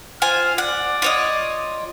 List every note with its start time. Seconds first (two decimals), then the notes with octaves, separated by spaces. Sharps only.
0.22 F4 C5 G#5 F6
0.58 D5 F#5
1.02 F4 C#5 D#5